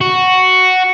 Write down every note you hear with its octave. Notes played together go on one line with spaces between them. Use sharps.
F#4